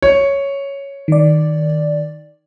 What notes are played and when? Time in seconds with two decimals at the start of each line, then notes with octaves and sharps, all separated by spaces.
0.02 C#5
1.08 D#3 D5